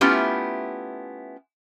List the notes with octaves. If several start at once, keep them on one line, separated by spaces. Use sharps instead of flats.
A3 B3 C#4 E4 F4 G4